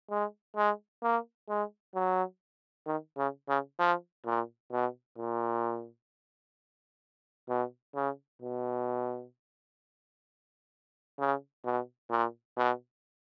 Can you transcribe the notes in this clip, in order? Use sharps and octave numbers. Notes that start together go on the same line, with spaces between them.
G#3
G#3
A#3
G#3
F#3
D#3
C#3
C#3
F3
A#2
B2
A#2
B2
C#3
B2
C#3
B2
A#2
B2